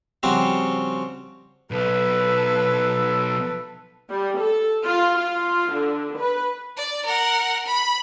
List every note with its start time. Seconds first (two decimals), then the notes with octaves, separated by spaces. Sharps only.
0.23 C#3 F3 G3 C4 F#4
1.71 B1 A4 B4
4.10 G3
4.39 A4
4.85 F4
5.18 F4
5.73 D3
6.18 B4
6.77 D5
7.05 A#4 F#5
7.67 B5